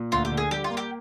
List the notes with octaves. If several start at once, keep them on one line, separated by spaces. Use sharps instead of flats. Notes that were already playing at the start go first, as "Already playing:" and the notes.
Already playing: A#2
D2 F4
G4
D3
G#4
G3 G4
F4
A#3
G4